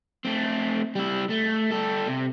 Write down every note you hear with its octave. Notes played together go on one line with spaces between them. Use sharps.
A3 C4
G3 E4
A3
G3 A4
C3